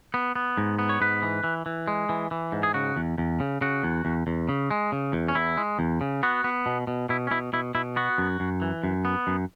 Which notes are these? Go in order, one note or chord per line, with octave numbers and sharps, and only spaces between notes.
B3
B3
G#2
B3
C#5
G#2 B4
E3
E3
E3
G#3
E3
E3
G#2
G#4
C#3 F#4
E2
E2
C#3
C#3 F#4
E2
E2
E2
C#3
G#3
C#3
E2
C#4
E2 E4
G#3
E2
C#3
B3 F#4
B3
B2
B2
B2 E4
C#4
B2 E4
B2 E4
B2 E4
B3 F#4
F#2
F#2
E3
F#2
B3
F#2